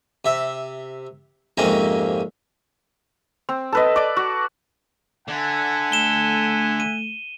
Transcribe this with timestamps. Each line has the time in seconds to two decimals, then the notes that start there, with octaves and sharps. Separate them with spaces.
0.25 C3 E5
1.57 F2 G#2 C3 A#3 C4 C#4
3.49 C4
3.73 A4 B4 D#5
3.96 D5 D6
4.17 F#4
5.28 D3 E5 F#5 G#5
5.92 A3 E7 G7
6.80 D#7